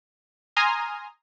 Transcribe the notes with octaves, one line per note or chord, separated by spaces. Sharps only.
G#5 A#5 C6 D#6 F6